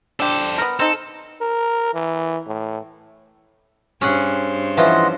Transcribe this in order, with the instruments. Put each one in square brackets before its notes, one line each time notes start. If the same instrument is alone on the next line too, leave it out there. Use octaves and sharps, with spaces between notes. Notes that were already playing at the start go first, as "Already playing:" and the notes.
[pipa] D4 G4 [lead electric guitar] A4 C5
[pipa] B3 A#4
[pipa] C4 D#4 [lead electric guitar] A4
[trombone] A#4
E3
A2
[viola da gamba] G2 C5 [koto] C#4 G#4 F#5
[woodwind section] E3 [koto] F3 C#4 E4 [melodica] F4 D#5 F#5